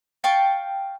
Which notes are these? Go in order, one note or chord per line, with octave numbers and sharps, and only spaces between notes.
F5 G5 A5 C#6